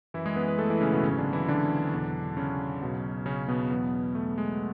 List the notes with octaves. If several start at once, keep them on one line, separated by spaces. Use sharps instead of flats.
F#2 E3 E4
G#3 G#4
B3 B4
B3 B4
A3 A4
E3 E4
C#3 C#4
B2 B3
G#1 G#2 C#3 F#3 C#4
D3 D4
E3 E4
D3 D4
E2 B2 F#3
C#3 C#4
B1 B2 F#3
C#3 C#4
B2 B3
E2 B2 F#3
A3
G#3